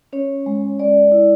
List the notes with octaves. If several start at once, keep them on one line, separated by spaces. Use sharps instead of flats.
C#4 C#5
G#3
G#3 D5
E4